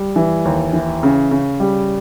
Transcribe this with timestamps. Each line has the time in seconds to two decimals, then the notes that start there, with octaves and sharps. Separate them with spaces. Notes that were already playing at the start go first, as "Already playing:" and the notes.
Already playing: G3
0.16 E3
0.45 D#2
0.73 E3
1.03 C#3
1.31 C#3
1.60 G3